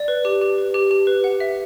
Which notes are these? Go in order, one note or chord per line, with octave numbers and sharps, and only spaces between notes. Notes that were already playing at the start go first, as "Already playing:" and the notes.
Already playing: D5
B4
G4
G4
B4
G4
G4
B4
F#5
E5